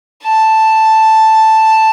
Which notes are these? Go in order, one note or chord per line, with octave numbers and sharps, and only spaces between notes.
A5